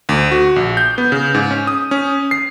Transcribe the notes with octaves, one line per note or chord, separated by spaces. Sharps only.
D2
F#4
A#1
G6
B3
C#3
G#2
C#4
D#6
C#4
C7